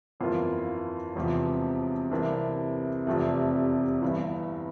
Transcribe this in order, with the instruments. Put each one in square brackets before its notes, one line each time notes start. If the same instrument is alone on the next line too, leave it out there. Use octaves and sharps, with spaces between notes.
[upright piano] G1 F2 E3 A#3 F4
E1 E2 C3 F3
C2 C3 E3 A#3 D4
F1 E2 C3 F3 A3
G1 G2 E3